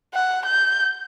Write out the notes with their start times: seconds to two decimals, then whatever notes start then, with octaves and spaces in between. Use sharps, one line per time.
0.14 F#5
0.46 G6